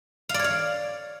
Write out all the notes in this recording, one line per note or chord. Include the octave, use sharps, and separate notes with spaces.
F5
D5
C#5
F5